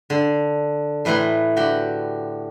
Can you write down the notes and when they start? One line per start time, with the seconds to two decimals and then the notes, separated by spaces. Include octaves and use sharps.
0.10 D3
1.05 A2 E3 B4 A#5 C6
1.56 D3 F#4 G4 G5 B5